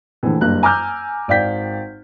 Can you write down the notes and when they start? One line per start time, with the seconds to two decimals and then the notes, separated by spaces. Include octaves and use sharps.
0.23 A#1 D3 E3 A3
0.41 F#1 G2 A#3 F#6
0.63 G#5 A#5 D6 E6 F6 G6
1.28 G#1 D5 F5 G5 G6 B6